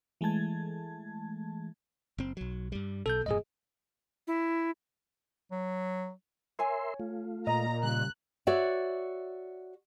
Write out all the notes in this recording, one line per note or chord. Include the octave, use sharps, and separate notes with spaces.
E3 G#3 A3 A5 G#6
F#1 C4
B1 F#3
G2 G3
B1 B2 A4 G6
E1 G2 A#2 G#4 D#5
E4
F#3
A#4 C#5 E5 G#5 C6
A3 F4
A#2 D#5 A#5
C#3 G3 F#6
F#4 C#5 D5 E5